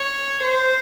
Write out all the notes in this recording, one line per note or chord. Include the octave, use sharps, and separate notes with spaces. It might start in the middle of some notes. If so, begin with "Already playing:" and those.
Already playing: C#5
C5